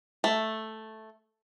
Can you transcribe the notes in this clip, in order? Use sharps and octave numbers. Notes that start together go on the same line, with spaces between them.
A3